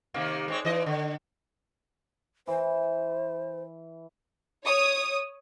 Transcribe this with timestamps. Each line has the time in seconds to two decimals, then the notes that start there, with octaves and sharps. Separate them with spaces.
0.14 C3 D#3 A#3
0.48 G#3 C4 C#5
0.65 E3 D#5
0.86 D3
2.47 E3 C5
4.65 C#5 D#6